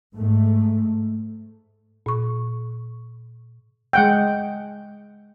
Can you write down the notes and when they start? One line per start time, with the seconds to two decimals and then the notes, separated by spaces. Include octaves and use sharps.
0.16 G#2 A3
2.06 A#2 C#6
3.93 G#3 F#5 G5